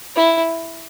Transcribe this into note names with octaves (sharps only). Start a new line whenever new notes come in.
E4